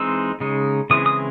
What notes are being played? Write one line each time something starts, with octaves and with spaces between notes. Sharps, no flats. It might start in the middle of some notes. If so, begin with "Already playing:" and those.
Already playing: E3 G#3 C4 D#4 E6
C#3 G#3 D#4
C#3 E3 G#3 C4 E4 D#6
D#6